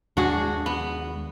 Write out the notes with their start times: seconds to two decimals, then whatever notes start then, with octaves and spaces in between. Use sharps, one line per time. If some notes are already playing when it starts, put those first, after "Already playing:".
0.17 D#2 G#3 D4 F#4 G#4
0.66 B3